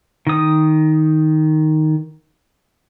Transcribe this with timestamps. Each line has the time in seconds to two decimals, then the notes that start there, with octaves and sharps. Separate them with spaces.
0.27 D#3 D#6